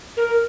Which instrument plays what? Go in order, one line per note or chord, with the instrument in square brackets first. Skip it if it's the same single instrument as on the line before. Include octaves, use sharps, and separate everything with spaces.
[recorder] A#4